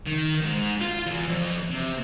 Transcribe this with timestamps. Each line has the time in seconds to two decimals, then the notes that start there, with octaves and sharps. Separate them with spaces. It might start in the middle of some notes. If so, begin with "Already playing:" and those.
0.06 D#3
0.41 G#2
0.81 F4
1.06 E2
1.28 F2
1.70 C3